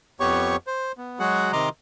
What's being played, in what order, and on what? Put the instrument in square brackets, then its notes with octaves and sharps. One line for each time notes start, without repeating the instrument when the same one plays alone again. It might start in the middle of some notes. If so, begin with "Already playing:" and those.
[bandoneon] F2 B3 G4 C#5 C#6
C5
B3
F#3 G#3 F#4 G#4 F#5
C3 D#3 D#5 A#5 C6 D6